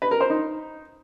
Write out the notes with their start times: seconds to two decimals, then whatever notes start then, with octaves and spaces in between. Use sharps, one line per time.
0.02 B4
0.11 A#4
0.21 C5
0.30 D#4